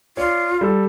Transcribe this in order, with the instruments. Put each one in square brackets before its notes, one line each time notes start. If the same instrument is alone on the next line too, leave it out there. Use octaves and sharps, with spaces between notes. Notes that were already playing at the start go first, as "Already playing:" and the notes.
[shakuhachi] F4 [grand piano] C#5 D5
[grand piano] G3 A4